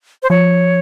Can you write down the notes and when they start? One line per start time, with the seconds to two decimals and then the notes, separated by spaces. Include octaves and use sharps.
0.23 C5
0.30 F3 C#5